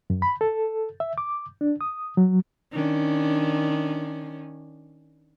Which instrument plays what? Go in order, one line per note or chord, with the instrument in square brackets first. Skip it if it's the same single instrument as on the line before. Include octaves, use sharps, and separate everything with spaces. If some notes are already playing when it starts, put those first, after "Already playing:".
[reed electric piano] F#2
B5
A4
E5
D6
D4
D#6
F#3
[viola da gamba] D#3 C#4 D4